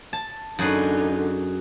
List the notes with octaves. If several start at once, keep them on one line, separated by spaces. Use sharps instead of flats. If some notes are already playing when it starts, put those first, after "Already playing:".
A5
F#2 D3 D#4 G#4 B4